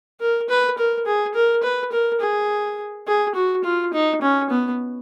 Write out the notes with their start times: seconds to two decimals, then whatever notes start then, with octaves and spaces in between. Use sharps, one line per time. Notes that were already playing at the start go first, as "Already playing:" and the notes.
0.21 A#4
0.49 B4
0.78 A#4
1.06 G#4
1.35 A#4
1.63 B4
1.92 A#4
2.21 G#4
3.07 G#4
3.35 F#4
3.64 F4
3.93 D#4
4.22 C#4
4.50 B3